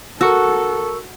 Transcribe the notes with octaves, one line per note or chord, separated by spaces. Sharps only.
F#4 A4 A#4 C#6 E6